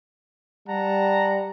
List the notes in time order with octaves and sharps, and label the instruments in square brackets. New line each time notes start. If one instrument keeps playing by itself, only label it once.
[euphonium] G3 [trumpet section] F#5 A5 A#5